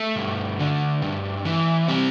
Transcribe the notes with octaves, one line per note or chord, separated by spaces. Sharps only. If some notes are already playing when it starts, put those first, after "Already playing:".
Already playing: A3
G2
D3
G2
E3
G3 C4